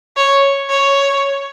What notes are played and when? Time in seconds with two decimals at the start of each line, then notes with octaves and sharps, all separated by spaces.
0.17 C#5
0.70 C#5